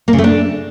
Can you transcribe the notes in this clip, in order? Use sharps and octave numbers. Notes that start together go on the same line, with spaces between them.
A#3
C#3
A3
D4